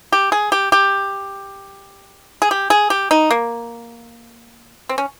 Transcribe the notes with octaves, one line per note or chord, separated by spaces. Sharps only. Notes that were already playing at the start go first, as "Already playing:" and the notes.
G4
G#4
G4
G4
G#4
G4
G#4
G4
D#4
A#3
C4
C#4